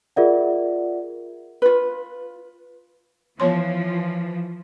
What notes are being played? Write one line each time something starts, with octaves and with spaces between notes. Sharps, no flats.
F4 G#4 A#4 D5 E5 F#5
F4 B4
E3 F3 B3 C#5 C6